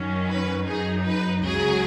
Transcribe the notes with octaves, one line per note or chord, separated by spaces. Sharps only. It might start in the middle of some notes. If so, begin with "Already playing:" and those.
Already playing: F#2 D#3 F#3 C#4
B4
F#2 F#3 D#4 G#4
B4
C#2 C#3 F#3 G#4